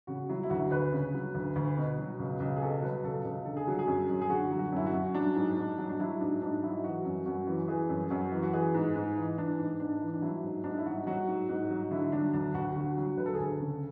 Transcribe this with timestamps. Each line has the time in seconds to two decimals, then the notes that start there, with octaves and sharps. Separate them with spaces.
0.07 C#3 F#4
0.29 F#3 E4
0.43 E4
0.50 D2 F#4
0.71 D2 B4
0.92 C#3
1.14 F#3
1.35 D2
1.56 D2
1.77 B2
1.98 F#3
2.19 C#2
2.40 C#2
2.57 G#4
2.62 B2 A4
2.82 F#3 B4
3.03 C#2 A4
3.25 C#2
3.45 D3 A4
3.57 G#4
3.67 F#3 F#4
3.79 G#4
3.88 F#2
4.10 F#2
4.21 G#4
4.30 D3 F#4
4.52 F#3
4.59 F#4
4.72 F#2 E4
4.86 F#4
4.93 F#2
5.15 F#3 D4
5.36 G#2
5.57 G#2
5.78 F#3
5.89 D4
6.00 F#3 E4
6.20 G#2 D4
6.41 G#2 D4
6.63 F#3 E4
6.84 E3 F#4
7.05 F#2
7.26 F#2 F#4
7.47 E3
7.68 E3 G#4
7.89 F#2
8.10 F#2 F#4
8.32 E3
8.43 F#4
8.53 E3 G#4
8.74 G#2
8.96 G#2
9.17 E3
9.38 E3 D4
9.59 G#2
9.80 G#2 D4
10.02 E3
10.13 D4
10.22 F#3 E4
10.43 G#2
10.64 G#2 D4
10.78 E4
10.86 F#3 F#4
11.06 F#3 F#4
11.28 G#2
11.49 G#2
11.70 F#3
11.91 D3 E4
12.12 F#3 D4
12.33 D2 D4
12.54 D2 F#4
12.76 D3 F#4
12.97 F#3
13.17 D2 B4
13.26 A4
13.34 G#4
13.40 D2 A4
13.60 C#3